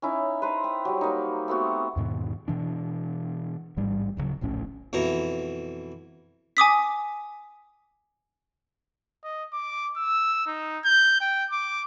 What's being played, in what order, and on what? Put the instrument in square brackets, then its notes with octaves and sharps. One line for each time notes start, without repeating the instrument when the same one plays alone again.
[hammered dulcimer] C#4 D#4 E4
B4 C5 A#5
G5
F#3 G3
A#3 D#4
A3 B3 C4 F#4
[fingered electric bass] E2 G#2 B2 D#3
B2 E3 D4
A1 G#2 G3
D1 D2 C#3 F#3
D1 A#1 A2 C#4
[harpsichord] F2 B2 E3 A#5
[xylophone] G#5 D6 D#6 B6
[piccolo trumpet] D#5
D6
E6
D#4
G6
G5
D6